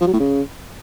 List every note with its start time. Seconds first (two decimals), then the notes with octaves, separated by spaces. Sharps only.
0.01 F3
0.07 F#3
0.13 A2
0.20 C#3